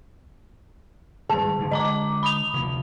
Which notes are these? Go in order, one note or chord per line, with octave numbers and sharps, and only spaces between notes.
G#1 G2 G3 G#4 A5
G1 G#2 D3
D3 G#3 D#5 A#5 D6
B5 D#6 F7
F1 D2